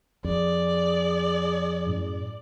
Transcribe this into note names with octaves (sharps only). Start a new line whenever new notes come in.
F2 G#4 D5
F#2 A2